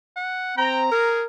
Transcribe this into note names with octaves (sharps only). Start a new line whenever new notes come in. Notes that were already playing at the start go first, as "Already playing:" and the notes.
F#5
C4 G5 A#5
G#4 A#4